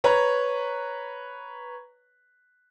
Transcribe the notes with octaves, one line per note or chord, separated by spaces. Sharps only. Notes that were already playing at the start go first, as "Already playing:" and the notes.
B4 C#5 A#5